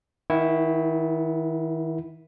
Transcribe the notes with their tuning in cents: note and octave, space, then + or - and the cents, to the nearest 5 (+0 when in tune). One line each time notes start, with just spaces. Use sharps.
D#3 +35 E4 +0 F#5 +0